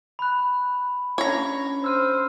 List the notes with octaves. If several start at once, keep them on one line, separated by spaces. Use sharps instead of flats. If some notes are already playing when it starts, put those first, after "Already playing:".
B5 F#6
C#4 D4 C#5 A#5
C5 E6 F6 D#7